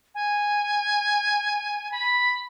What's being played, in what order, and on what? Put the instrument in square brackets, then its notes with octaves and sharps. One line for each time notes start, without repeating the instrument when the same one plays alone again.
[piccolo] G#5
B5